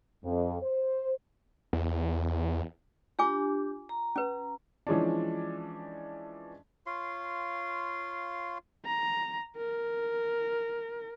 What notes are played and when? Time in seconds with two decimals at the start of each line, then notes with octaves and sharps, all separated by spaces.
0.23 F2
0.62 C5
1.73 E2
3.19 D4 F4 G4 G#5 D6
3.89 A#5
4.16 C#4 B4
4.87 E3 F3 G#3 C#4 D4
6.86 F4 C#5 F5 C6
8.85 A#5
9.57 A#4